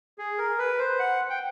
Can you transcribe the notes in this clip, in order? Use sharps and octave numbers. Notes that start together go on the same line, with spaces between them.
G#4
A#4
B4
C5
F#5
G5